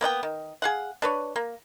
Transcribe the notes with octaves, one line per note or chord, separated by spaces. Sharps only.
A#3 B3 D5 G5
D#3
G#4 F5 F#5
D4 B4 C#5
A#3